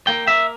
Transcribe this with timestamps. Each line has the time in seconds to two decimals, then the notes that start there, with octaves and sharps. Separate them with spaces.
0.07 A#3 G5
0.28 A#3 E5